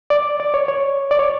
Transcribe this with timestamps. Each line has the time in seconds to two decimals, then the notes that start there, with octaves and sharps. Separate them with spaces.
0.10 D5
0.40 D5
0.54 C#5
0.68 C#5
1.11 D5
1.19 C#5